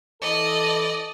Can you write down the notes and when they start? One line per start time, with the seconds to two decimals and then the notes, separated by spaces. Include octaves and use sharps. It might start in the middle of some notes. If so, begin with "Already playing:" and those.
0.22 E3 A4 D5 D#5